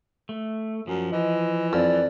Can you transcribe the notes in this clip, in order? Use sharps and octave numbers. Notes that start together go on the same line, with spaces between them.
A3
F#2 F3
E3 D#5
F2 D5